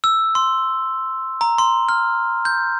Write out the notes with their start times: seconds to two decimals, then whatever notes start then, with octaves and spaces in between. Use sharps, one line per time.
0.04 E6
0.35 C6
1.41 A#5
1.58 C6
1.89 F6
2.45 G6